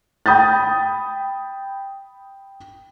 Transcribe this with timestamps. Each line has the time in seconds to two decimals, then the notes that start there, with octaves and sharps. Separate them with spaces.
0.26 G5 B5 D#6 G6 A6